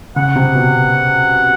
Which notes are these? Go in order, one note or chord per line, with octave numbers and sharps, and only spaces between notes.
C#3 F#5
C3
B2